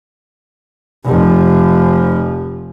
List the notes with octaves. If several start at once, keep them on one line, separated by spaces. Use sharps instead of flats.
F1 F3